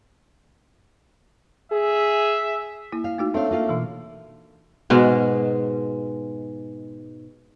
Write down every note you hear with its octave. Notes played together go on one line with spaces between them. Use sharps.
G#4 E5
A#3 E4
F5
A3 D#4 F#4
A3 C4 D4 C#5 F5
A#3 F4 F5
B2 E3
G#2 B2 G#3